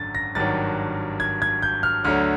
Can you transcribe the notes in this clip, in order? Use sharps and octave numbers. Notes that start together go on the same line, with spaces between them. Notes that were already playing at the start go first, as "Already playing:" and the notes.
Already playing: G#1 F#2 D3 A6
A#6
G#1 G2 D#3 F#3 A6
G#6
G#6
G6
F6
D2 D3 F#3 F6